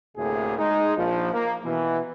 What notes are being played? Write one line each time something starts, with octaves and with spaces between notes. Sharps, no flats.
D2 A2 C3 A#3 G#4
G#3 D#4
A#1 F3
A#3
B2 E3